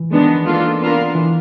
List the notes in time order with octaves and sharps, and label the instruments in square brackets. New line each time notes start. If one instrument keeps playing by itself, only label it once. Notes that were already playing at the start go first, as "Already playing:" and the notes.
Already playing: [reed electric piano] E3
[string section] D#3 G#3 B3 D4
A#3 D4 F4 A4
B3 D4 F4 A#4
[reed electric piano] E3